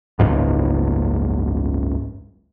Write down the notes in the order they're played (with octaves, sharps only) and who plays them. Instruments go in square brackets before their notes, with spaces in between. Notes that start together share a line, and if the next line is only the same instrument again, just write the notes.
[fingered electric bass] F#1 C#2 G#2